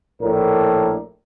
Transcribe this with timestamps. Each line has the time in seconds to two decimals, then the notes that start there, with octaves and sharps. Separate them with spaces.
0.21 A#1 A2 D4 A#4